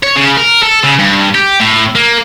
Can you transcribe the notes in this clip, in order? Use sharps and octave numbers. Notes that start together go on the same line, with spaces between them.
C#5
C#3
A#4
A4
C#3
G2
G4
A2
A#3